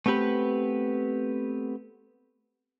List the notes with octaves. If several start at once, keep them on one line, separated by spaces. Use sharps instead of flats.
A3 B3 C4 G4 B4